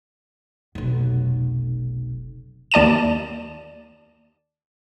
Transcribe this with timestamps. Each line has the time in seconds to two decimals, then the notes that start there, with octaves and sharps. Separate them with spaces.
0.75 F1 B1
2.72 D#2 D5 A5 D#7 E7